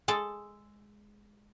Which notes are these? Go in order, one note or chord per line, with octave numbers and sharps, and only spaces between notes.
G#3 G#4 A4